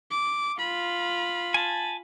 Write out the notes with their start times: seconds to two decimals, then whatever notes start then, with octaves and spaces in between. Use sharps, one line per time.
0.11 D6
0.59 F4 B5
1.54 G#5 A5